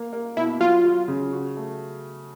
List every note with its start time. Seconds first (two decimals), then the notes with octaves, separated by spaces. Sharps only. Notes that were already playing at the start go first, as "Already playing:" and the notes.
Already playing: A#3
0.13 A#3
0.37 B2 E4
0.60 F#3 F4
0.85 F#3
1.08 C#3
1.32 F#4
1.57 A3